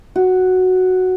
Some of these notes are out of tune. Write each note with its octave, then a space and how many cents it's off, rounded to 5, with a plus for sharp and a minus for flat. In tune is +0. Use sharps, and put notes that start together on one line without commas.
F#4 +0